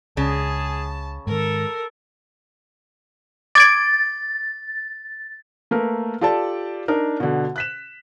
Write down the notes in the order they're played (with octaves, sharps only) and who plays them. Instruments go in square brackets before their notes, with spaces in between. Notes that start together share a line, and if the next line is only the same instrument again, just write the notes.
[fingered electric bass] C#2 [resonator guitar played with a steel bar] C#3 [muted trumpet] G#4 [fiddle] A5
[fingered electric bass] G#2 D#3 [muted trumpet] A4 [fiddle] A#4
[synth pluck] D6 G#6 D7 [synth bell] A6
[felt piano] A3 A#3 A#4 B4
F4 G4 A4 D5 A5
D4 D#4 A#4
B2 D3
F#6 B6 E7